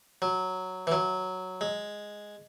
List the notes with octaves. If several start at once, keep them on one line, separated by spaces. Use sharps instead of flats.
F#3
E3
F#3
G#3